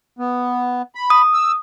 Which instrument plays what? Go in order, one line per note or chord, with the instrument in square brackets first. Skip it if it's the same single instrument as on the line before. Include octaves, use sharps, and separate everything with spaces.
[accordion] B3
B5
[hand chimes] D#6
[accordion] E6